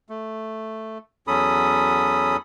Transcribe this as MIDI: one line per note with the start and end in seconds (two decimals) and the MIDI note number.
0.09 0.98 57
1.28 2.36 40
1.28 2.36 54
1.28 2.36 61
1.28 2.36 69
1.28 2.36 83
1.28 2.36 87